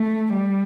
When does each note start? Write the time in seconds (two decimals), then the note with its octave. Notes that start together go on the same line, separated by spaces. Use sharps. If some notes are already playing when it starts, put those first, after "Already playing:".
Already playing: A3
0.33 G3